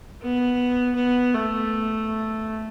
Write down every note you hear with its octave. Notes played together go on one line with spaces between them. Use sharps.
B3
B3
A3